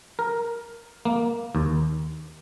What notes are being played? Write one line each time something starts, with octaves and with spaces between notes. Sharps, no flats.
A#4
A#3
D#2